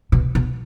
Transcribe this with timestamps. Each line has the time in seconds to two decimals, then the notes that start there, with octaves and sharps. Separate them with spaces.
0.12 B2
0.35 B2